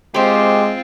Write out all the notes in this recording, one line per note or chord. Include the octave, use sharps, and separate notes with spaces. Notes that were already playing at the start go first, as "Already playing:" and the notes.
G#3 C4 F4 G4 C5